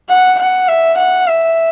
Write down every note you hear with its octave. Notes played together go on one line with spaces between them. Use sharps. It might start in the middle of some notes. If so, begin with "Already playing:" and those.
F#5
F#5
E5
F#5
E5